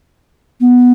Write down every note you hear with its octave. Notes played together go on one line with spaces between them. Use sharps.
B3